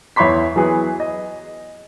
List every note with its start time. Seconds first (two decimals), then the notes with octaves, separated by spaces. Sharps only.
0.16 E2 E4 C#5 B5 C6 B6
0.56 E3 F#3 B3 G#4
1.00 D#5